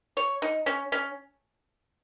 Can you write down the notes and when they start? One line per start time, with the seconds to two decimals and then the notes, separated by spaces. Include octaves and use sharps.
0.17 C#5
0.42 D#4
0.66 C#4
0.92 C#4